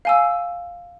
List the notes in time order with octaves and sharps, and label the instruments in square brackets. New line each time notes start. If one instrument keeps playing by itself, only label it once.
[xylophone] F5 G#5 E6